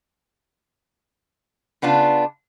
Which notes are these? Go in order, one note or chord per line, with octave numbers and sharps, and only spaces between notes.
C#3 B3 D4 F4